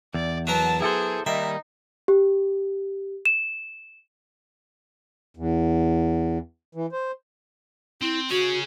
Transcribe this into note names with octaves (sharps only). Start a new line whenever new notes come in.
E2 D5
F#3 B3 A#4 A5
E4 G#4 A4 C5
D#3 G3 A#3 D#4 E5
G4
E7
E2
E3
C5
C4 E4
F#4 G#4 C#5